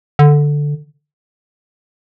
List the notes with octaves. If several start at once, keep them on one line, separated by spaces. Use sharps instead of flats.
D3